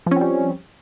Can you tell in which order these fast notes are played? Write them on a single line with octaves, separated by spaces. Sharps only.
F3 C#4 C4 G3